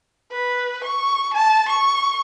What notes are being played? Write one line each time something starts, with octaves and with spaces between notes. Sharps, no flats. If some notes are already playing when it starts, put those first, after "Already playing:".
B4
C#6
A5
C#6